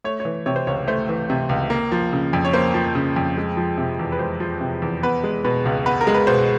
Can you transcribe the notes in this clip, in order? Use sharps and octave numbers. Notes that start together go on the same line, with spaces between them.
A3 C#5
C#5
E3
C3 C#5
C5
C#2 C#5
A3 C5
E3
C3
C#2
A#3
F3
C#3
F2
C#5
A#3 C5
F3
C#3
F2
G#3
F3
C3
E2
B4
G#3 C5
F3
C3
E2
B3 B4
G#3
B2 B4
C#2
B3 B4
A#4
G#3
B4
B2 C5